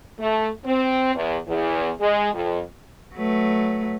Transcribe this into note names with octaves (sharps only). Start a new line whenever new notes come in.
A3
C4
E2
E2
G#3
F2
F#3 A3 B4